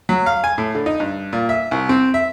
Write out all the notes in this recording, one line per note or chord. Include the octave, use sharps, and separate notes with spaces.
F#3
F5
G#5
A2
D3
D#4
G2
A#2
E5
C2
C4
E5